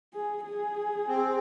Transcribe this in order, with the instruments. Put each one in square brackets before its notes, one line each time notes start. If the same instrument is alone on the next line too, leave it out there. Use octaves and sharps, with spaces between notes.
[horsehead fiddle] G#4
G#4
[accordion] C4